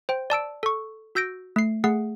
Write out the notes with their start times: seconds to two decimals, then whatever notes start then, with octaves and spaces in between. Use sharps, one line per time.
0.09 C5 G5
0.30 D5 A5 E6 D7
0.63 A4 C#6
1.15 F#4 E6 G6 A#6 D7
1.56 A3 C7
1.84 A3 G#4 F#5 C7